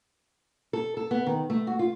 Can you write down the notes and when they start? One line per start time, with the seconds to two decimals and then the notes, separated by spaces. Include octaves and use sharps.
0.73 A4
0.97 A4
1.11 B3
1.27 D#3
1.50 A3
1.67 F#4
1.79 F4